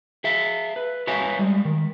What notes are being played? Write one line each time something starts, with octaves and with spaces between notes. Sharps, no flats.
G#4 E5 F5
B4
F#4 B4 C#5 E5 F5 G#5
G3 G#3
D#3